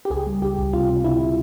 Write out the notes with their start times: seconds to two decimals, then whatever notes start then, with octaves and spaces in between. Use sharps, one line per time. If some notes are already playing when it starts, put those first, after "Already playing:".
0.05 G4
0.10 C#2 G#4
0.27 G3
0.42 C#2 G4
0.58 C#2
0.73 C3 F4
0.89 C3
1.04 C#2 E4
1.21 C3